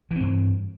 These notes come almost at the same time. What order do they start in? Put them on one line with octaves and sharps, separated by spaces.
E3 C4 G2